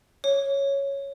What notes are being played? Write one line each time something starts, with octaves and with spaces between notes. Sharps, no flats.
C#5